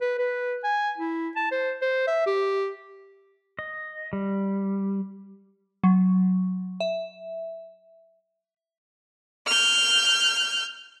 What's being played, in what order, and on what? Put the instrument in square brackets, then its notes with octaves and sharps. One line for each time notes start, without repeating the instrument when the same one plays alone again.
[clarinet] B4
B4
G#5
E4
A5
C5
C5
E5
G4
[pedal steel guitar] D#5
G3
[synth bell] F#3
E5
[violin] F6 G6